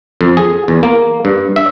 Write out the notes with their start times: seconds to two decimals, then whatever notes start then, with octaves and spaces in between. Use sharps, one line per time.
0.21 F2
0.37 G#4
0.68 E2
0.83 A#3
1.25 G2
1.56 E5